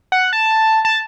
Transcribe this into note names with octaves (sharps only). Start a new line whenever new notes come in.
F#5
A5
A5